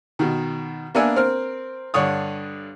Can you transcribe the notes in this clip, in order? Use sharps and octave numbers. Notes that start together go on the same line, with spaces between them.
B2 D#3
A#3 B3 D4 E5 G#5
C4 A#4 F6
G2 D3 D4 C#5 D#6